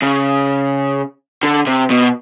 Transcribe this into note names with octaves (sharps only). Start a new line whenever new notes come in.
C#3
D3
C3
B2